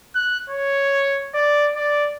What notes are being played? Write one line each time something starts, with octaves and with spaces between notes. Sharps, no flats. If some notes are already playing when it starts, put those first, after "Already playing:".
F#6
C#5
D5
D5